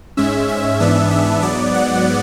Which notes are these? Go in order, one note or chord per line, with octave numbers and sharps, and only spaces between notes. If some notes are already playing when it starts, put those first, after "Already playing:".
G#2 G#3 C#4 E5
E5
G#2 E3 B3 D4
E5
G#2 F#3 B3 D5
F#5